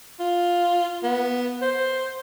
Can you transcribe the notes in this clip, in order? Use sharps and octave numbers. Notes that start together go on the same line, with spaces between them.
F4
B3
C5